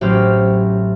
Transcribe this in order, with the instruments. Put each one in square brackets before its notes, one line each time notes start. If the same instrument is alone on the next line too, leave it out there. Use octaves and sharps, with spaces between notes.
[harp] A1 F#3 C#4 G4 C5 F6